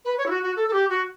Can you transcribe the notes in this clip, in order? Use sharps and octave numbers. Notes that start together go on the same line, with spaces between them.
B4
C#5
E4
F#4
F#4
A4
A4
G4
F#4